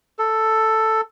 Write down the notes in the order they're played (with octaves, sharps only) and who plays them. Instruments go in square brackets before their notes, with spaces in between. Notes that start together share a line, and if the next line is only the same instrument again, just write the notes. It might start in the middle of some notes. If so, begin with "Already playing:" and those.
[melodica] A4